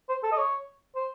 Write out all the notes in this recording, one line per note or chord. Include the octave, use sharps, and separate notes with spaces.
C5
A4
D#5
C#5
C5